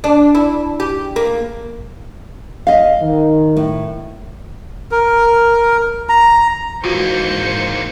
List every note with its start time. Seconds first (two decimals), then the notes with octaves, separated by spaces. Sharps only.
0.04 D4
0.35 E4
0.80 G4
1.16 A#3
2.67 D#5 F5
3.02 D#3
3.57 A2
4.91 A#4
6.09 A#5
6.84 G#1 G#2 E3 A#3 F4 F#4 C5 C#7